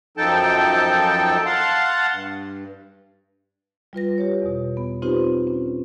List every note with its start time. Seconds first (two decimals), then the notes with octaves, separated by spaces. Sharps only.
0.17 F#2 F3 D#4 A4 G5 A5
1.46 F5 F#5 A5 C6
2.12 G2
3.93 G3 F4 B4 A#6
4.18 G4 B4 C#5
4.42 E2 B2
4.77 B3
5.02 C4 D#4 F4 G4 B4 C5
5.47 C#4